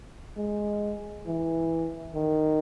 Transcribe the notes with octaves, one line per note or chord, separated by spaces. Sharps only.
G#3
E3
D#3